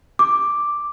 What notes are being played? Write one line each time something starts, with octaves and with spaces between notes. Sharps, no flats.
D6